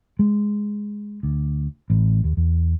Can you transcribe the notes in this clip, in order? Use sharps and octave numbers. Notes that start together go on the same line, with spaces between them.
G#3
D2
A1
D#2
E2